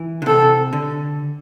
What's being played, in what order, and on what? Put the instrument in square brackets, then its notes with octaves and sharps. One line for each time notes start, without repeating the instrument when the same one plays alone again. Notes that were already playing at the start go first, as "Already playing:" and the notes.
Already playing: [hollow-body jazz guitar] E3
D3
[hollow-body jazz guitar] C3 [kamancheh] A4
[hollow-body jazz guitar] D3